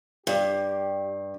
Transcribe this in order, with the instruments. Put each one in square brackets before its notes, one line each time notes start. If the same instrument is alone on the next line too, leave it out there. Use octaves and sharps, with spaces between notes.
[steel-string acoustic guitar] G2 [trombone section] G4